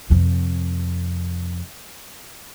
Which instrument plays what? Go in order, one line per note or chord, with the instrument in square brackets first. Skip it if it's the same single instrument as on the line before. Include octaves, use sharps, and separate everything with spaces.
[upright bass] F2 C3